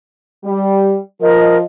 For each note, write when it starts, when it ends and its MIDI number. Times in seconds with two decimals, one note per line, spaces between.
0.45 0.96 55
1.21 1.61 53
1.21 1.58 70
1.21 1.61 75